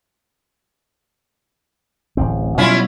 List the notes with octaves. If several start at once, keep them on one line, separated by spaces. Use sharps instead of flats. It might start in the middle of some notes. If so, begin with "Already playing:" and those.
D1 A1 C4
B2 F#3 G3 C#4 E4 F4